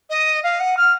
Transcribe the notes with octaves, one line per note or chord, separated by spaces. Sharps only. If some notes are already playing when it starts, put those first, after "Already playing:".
D#5
F5
F#5
F6